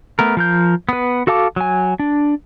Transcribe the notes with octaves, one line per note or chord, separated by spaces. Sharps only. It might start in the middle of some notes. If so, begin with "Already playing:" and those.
A3 B3 A#4
F3 A#4 G6
B3 B4
F#4 A4 F5 A5 D6
F#3 G#5
D4